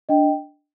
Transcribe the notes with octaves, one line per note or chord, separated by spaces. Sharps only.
D4 D#5 G5